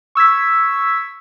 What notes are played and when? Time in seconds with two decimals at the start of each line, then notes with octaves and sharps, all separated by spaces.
0.15 C#6 E6 G#6 B6